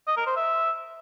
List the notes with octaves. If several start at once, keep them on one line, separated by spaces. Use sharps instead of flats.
D#5
A#4
C5
E5